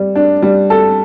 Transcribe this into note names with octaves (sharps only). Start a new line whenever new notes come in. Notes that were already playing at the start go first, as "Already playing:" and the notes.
Already playing: G3
D4
G3
A4